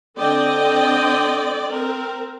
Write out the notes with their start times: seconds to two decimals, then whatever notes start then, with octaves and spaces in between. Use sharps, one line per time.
0.18 D3 C4 D5 D#5 G5
1.72 C4 A#4